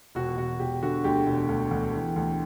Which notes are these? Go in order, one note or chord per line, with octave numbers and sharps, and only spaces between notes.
E1 F#4
E1 F#4
E1 G4
D3 F#4
D2 G4
E1
D2
D2
E3
D2